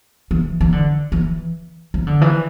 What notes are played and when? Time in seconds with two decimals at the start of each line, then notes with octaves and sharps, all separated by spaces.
0.31 E3
0.61 E3
0.72 D3
1.12 E3
1.94 E3
2.07 D3
2.21 E3